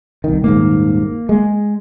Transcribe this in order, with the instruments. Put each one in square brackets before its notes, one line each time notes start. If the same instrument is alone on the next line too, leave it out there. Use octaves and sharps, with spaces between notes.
[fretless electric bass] C2 D#3
[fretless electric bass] D#1 D#2 G#2 [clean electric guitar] A#3
[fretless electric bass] G#3